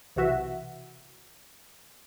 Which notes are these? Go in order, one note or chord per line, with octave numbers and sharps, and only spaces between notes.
B1 C3 E3 F#4 E5